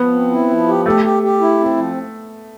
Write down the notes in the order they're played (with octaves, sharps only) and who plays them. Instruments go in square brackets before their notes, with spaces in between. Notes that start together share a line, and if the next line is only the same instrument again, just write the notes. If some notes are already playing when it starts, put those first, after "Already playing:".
Already playing: [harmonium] F3 [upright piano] B3
[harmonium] C4
E4
F3
G4
[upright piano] A3 [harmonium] G4
[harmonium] G4
G4
E4
C4
F3